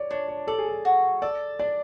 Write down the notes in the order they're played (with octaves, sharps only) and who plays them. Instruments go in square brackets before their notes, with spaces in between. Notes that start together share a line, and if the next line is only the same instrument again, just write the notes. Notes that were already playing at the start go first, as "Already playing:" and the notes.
Already playing: [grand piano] C#5 D5
[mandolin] D4 [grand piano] C#5
[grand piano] C#5
[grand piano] A4 [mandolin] D5
[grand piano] G#4
A4
[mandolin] F#4
[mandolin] A4 [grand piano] D5
[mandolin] D4 [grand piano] D5